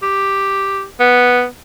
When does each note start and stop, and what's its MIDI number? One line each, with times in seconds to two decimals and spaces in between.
0.02 0.84 67
1.00 1.45 59